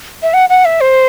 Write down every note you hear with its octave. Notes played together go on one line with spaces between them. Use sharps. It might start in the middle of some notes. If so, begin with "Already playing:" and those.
E5
F#5
F#5
E5
C5